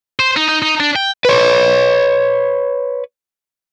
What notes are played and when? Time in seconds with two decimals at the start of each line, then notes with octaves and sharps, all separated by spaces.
0.19 C5
0.36 D#4
0.49 D#4
0.62 D#4
0.80 D4
0.96 G5
1.25 B4 C#5